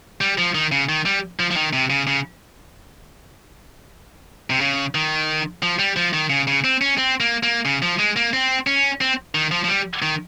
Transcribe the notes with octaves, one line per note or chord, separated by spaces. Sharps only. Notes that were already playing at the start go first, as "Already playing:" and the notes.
G3
F3
D#3
C#3
D#3
G3
F3
F3
D#3
C3
C#3
C#3
C3
C#3
D#3
F3
G3
F3
D#3
C#3
C#3
C4
C#4
C4
A#3
A#3
C#3
F3
G#3
A#3
C4
C#4
C4
D#3
F3
F3
G3
D#3